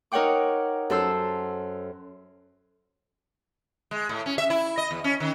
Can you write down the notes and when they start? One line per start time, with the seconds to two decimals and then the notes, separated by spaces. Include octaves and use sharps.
0.12 D#4 A#4 C#5 F#5 G5 D6
0.90 F#2 A4 C5 E6
3.91 G#3
4.09 A2
4.26 C#4
4.38 E5
4.50 E4
4.78 D#5
4.91 E2
5.04 C#4
5.20 D#3